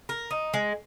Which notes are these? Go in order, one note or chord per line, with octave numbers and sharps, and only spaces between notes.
A#4
D#4
G#3